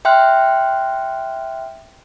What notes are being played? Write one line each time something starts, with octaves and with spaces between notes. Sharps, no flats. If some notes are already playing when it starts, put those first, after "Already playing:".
E5 G5 C6 F6 F#6